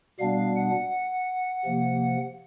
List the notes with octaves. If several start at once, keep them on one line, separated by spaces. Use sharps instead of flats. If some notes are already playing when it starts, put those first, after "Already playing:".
B2 G3 B3 D4 F5
F#5
C3 F3 A#3